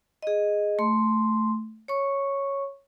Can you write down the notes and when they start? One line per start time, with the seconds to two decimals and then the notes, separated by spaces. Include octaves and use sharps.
0.23 G#4 D#5
0.79 A3 C6
1.88 C#5 C#6